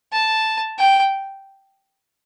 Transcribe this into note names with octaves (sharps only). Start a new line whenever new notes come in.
A5
G5